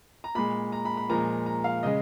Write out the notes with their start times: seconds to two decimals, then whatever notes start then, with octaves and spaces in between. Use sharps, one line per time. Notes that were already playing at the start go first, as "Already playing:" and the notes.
0.24 A#5
0.35 A#2 G#3 B5
0.72 A#5
0.85 B5
0.97 B5
1.09 A#2 F3 G#3 A#5
1.46 A#5
1.64 F5
1.83 C#3 G#3 D#5